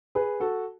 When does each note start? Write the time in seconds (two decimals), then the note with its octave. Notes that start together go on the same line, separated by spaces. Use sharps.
0.15 G#4 B4
0.40 F#4 A4